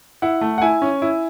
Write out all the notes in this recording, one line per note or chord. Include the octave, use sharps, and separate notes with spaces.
E4 F#5
A3
F#5
E4 G#5
C#4
E4